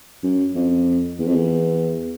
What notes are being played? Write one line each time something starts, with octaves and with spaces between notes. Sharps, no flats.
F#2
F2
E2
F2
E2